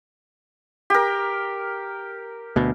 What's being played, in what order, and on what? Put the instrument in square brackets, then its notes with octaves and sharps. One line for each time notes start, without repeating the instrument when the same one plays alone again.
[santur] G4 A#4
[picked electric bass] D2 B2